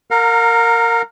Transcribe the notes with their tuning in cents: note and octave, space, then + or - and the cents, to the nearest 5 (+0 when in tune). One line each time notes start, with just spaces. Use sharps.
A#4 -15 F5 +45 A#5 +0